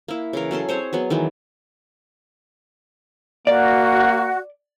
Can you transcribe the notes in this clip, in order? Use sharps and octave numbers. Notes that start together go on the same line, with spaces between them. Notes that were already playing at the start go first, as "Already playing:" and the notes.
A#3 E4
C#3 E3 A#4
F#3 C#4 A4 C6
C4 G#4 C5 C#5
F#3 B3 G#4
D#3 E3 F#3 G#3
A#3 F#4 D5